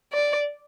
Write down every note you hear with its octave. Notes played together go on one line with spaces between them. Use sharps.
D5